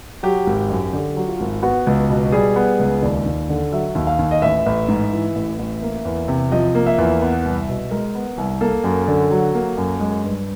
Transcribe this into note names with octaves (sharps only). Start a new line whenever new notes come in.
F#3 G4
G#1
F#2
D3 G4
F#3
F4
G#1
B3 F#4
C#2
B2
G3 G#4
B3
C#2
D#2 D5
D#2
D3
F#3 E5
D#2
F5
D#2
D#5
A1 E5
A1
G#2
E3
A1
A1
A#3
E2
C3
F3 D#5
A#3
E5
E2
B3
C2
B2
G#3 A#4
B3
C2
A#3 A4
F#2
D3
F#3
A#3
F#2
G#3
G2